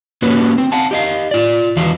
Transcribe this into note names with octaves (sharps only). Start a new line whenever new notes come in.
A#3 C#4 F#4 G4 B4 C#5
C4
F5 F#5 A5
G4 D#5 F5
F4 D5
E2 E3 F#4 F5